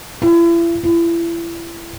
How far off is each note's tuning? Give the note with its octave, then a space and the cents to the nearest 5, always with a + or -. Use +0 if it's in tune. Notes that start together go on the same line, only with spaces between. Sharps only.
E4 +40
E4 +35